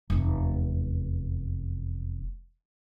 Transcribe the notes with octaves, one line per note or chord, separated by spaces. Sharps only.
F1 E2